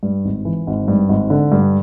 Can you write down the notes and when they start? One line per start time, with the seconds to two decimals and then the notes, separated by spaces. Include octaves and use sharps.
0.03 G2
0.25 G#1
0.45 E3
0.67 G#1
0.88 G2
1.09 G#1
1.30 D3
1.52 G2